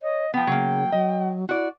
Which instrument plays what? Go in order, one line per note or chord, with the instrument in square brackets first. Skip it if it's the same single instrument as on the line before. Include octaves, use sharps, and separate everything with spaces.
[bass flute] C#5 [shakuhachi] D#5
[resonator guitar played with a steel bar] F3 B3 [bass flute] F#5 [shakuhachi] G5
[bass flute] C#3 [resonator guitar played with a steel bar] F#3 A#3
[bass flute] F#3 [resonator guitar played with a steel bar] D#5
[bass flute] E4 [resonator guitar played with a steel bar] F#4 D5